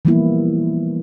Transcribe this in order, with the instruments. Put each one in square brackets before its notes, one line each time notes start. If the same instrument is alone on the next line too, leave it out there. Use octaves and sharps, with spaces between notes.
[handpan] E3 F3 G3 A#3 B3 E4